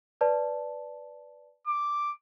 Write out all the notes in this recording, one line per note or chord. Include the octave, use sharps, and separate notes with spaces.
B4 D5 A5
D6